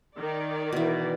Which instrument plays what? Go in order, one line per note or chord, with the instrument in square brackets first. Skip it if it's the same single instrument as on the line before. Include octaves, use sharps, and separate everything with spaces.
[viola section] D#3 D5
[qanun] B2 E3